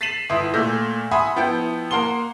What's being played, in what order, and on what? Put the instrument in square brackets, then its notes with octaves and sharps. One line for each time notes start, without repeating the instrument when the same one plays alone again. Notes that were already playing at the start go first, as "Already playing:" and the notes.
[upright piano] A6 B6 C7 D#7 E7 F#7
G1 E4 E5 C6 D#6
A#2 A3 E6 G6 A#6
E5 F#5 G#5 B5 C6 D#6
F3 B3 E4 G5 G6
A#3 A#4 F#5 C6 G7